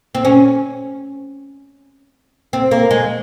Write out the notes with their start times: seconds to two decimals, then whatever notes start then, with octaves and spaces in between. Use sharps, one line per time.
0.15 C4
0.25 C#4
2.53 C4
2.71 A#3
2.91 G#3